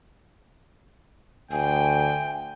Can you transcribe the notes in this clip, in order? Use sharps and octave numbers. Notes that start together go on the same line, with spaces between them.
D2 G5 G#5